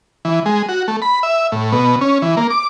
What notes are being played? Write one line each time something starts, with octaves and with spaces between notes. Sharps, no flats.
E3
G#3
F#4
A3
B5
E5
A2
B2
C#4
E3
A#3
D6